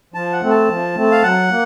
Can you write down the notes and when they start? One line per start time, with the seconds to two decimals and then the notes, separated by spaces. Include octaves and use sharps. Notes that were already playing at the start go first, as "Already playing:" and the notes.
0.14 F3 A5
0.32 F#5
0.42 A3 C4
0.51 A5
0.68 F3
0.96 A3 C4
1.11 F5
1.22 F#3 F#5
1.50 A#3